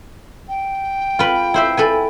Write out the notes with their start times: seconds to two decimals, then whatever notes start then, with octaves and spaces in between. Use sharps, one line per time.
0.48 G5
1.19 F4 B4
1.54 E4 C5 E5
1.77 A4 B4 G#5